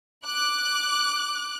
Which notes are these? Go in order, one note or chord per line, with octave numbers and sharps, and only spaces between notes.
D6 F#6